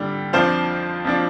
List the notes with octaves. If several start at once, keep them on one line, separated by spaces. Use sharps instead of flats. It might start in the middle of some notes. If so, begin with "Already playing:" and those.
Already playing: D3 G3 D4
F2 F3 D4 C5 F5
F2 F3 D4